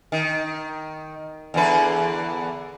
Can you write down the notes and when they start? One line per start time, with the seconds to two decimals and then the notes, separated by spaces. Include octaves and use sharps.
0.12 D#3
1.54 E2 D3 B4